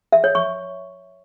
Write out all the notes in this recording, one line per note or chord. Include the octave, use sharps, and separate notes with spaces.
E5
C#5
C#6